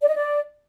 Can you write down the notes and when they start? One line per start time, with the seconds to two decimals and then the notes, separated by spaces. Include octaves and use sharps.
0.01 D5
0.09 D#5
0.16 D5